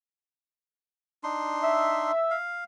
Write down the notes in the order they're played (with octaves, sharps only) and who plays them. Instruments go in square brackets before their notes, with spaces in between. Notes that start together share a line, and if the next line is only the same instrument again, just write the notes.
[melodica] D4 D#4 C6
[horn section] E5
[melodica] F5